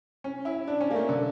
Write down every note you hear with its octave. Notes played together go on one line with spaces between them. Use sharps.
C#4
E4
D4
C#4
A#3
A3
D3